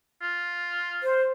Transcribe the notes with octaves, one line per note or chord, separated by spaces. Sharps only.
F4
C5